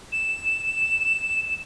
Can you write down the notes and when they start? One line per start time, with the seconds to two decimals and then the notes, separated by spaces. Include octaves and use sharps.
0.12 E7
1.49 E7